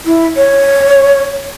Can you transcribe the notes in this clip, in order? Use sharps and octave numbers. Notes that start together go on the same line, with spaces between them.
E4
C#5